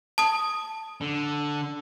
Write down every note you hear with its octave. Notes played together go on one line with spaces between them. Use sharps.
A5 D#6
D3